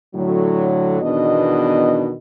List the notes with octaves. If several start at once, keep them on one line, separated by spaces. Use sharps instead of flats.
A2 D3 F#3
E2 B2 D#3 D4 D#5